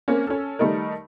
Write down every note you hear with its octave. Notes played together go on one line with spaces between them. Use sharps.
A#3 C4 C#4
C#4 A4
D#3 G3 A3 D#4 A#4